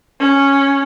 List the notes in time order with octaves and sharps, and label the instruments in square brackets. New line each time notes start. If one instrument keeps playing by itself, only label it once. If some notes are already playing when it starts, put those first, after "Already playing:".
[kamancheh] C#4